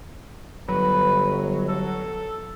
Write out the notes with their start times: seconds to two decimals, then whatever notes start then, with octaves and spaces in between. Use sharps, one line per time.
0.68 G1 F#3 B4
1.69 A4